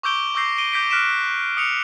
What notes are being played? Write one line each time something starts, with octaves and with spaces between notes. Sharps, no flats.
C#6 D6 E6 G6 D7 G7
C#6 D6 E6 G6 A#6 C7
D7 D#7 G7
D6 G6 A#6 B6 D7
F6 F#6 B6 D7 E7
D#6 C#7 F7